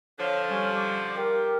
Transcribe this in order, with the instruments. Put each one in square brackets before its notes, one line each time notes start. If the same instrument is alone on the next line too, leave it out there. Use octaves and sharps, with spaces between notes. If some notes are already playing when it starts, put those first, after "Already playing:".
[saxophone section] D3 F3 [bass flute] C#5
[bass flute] G3 [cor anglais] C#4
[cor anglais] D5
[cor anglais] G4 [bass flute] A#4